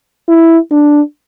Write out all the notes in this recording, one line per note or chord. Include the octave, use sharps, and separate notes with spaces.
E4
D4